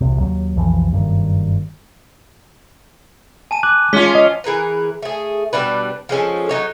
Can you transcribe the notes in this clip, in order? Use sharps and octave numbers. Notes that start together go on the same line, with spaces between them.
E1 C2 C3
D#2 F#3
B1 F2 E3 F3
F#1 G2 B2 D#3
G#5 A5 D#7
D6 F#6
G#3 C#4 F4 B6 G7
D#5
E3 G#4 A#4 B4
A3 G#4
B2 G3 D4 B4
F3 G#3 C#4 A4
F#3 D#4 C#5